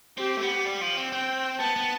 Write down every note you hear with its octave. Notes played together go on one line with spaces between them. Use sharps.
C4 G4
A3
B3
G3
F3
C4
C4 G5
B3 A5
B3